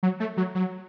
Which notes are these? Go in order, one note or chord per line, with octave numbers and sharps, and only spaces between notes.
F#3
A3
F#3
F#3